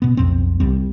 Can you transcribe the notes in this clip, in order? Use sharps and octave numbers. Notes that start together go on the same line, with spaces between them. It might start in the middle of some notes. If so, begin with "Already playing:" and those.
B2 B3
B1 F2 C4
C2 G3 C4